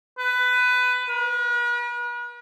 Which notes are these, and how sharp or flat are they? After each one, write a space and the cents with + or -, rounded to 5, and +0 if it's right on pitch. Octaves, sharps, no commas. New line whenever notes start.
B4 +15
B4 -45